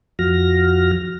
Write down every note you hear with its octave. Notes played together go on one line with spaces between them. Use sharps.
F2 F3 F#4 F6 A#6